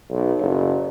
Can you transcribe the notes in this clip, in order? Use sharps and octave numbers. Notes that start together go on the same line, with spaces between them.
B1
F#1